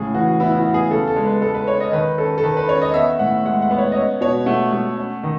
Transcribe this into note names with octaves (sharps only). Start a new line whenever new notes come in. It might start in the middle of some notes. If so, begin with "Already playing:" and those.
Already playing: A2 C#3 G#4
E3 F#4
B3 E4
E4
F#4
B3
G#4
C#3 A4
A4
G#3
B4
G#3 A4
B4
C#4 C#5
D#5
D#3 B4
C#4 A4
A4
D#3 B4
B4
C#4 C#5
D#5
B3 E5
A2 F#5
G#3 F#5
F#5
B3
C#5
D#5
C#4 C#5
B2 C#5
A3 F#5
A3
C#4
D#3